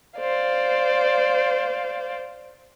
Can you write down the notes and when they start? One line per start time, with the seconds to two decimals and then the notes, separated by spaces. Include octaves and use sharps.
0.20 C5 D5 F5